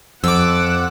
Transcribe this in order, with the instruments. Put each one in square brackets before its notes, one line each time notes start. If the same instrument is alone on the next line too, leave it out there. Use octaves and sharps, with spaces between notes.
[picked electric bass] F2 [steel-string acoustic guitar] F3 [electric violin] F#5 F#6 [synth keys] D6 E6